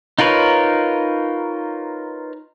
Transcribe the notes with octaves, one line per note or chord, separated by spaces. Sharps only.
D#4 F4 A#4 B4 C#5